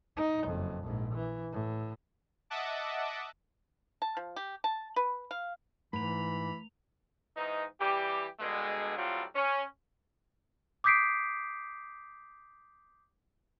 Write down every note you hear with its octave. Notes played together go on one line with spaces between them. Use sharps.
D#4
F#1 F2
A#1 G#2
E3
A2
D#5 E5 F#5 A5 D6
A5
F3
G4
A5
B4
F5
G#2 E3 A3 B5 F7
G#2 E3 D#4
E3 G3 G4
G2 B2 D3 G#3
A2 F#3 G3 C4 F4
C#4
D6 D#6 G6 B6 C7 D7